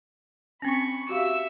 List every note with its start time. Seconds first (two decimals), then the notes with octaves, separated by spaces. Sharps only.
0.62 C4 C#4 B5 C#6
1.09 F#4 G4 E5 F5 E6